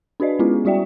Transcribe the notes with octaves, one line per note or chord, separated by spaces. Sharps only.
D4 F#4 B4 D5 D#5
G#3 B3 C#4 E4 F4 G#4
G3 E4 F#4 D5 E5 G5